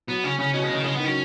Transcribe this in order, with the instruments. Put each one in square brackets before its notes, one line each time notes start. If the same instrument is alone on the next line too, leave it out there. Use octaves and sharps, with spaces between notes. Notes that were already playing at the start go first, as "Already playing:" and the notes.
[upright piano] F#3 [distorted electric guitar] B3
[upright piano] C#3 [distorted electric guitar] C#4
[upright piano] C#3 [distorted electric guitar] C#4
[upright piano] B2 [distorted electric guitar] C#4
[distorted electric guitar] G#3
[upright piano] C#3
[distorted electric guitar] D#3
[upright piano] C#3 [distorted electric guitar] G#3
[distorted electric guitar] B3
[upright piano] D#3
[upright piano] F#3 [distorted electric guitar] C#4